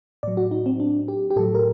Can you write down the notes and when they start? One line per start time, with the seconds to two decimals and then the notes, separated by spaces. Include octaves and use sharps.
0.23 A2 F#3 D5
0.37 F#4
0.51 D#4
0.66 C4
0.80 D4
1.08 G4
1.31 G4
1.36 A2 F#3 A4
1.55 A#4